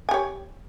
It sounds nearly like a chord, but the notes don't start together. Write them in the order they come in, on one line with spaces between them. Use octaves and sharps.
G#5 G4 C#5